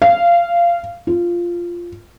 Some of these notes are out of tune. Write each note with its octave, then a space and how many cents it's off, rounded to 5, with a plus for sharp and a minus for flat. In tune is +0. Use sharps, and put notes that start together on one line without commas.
F5 -20
F4 -5